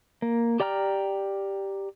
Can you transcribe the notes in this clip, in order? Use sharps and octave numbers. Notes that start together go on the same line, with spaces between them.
A#3
G4 D5 G5 A#5 F6